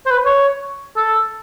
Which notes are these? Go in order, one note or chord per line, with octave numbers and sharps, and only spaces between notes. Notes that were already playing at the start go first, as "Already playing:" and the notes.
C5
B4
C#5
A4